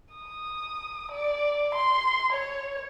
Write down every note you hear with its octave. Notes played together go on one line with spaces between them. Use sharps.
D#6
D5
C6
C#5